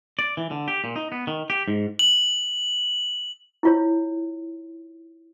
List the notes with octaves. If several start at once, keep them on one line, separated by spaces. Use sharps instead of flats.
D5
E3
D3
G4
A#2
D#4
B3
D#3
G4
G#2
F#7
E4 F4 C#5